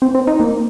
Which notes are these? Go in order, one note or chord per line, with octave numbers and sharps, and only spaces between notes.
C4
C4
D#4
A#3